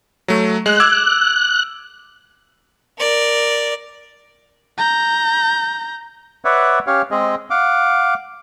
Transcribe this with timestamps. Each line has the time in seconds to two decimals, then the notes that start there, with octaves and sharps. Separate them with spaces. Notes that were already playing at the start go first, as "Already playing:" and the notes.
0.28 F#3 A3
0.66 G#3 F#6
0.80 D6 E6 G#6
2.99 A#4 D5
4.78 A#5 G6
6.45 B4 C#5 D5 E5 F#5
6.87 C#4 G4 C#5 F5
7.11 G#3 C4 G#4 D#5
7.50 F5 F#5 D6